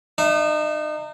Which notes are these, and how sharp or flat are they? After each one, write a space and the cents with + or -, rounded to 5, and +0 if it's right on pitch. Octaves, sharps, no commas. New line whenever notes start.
D#4 -35 E5 +0